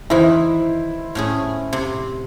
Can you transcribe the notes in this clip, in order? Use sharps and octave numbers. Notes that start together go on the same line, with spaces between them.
D#3 E3 E4 C5
A2 C#4 G#4
C3